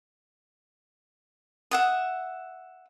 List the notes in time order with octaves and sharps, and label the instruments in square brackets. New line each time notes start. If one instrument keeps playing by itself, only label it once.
[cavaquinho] E5 F#5 D#6